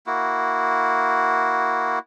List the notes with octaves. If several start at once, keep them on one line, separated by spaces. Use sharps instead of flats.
A#3 E4 F#4